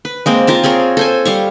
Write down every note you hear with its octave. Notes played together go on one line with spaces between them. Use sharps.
B4
G#3 A#3 C4
F4 A#4 A5
C4 G#4 A#4 C#5
A4 C5 G#5
G3 F5 C#6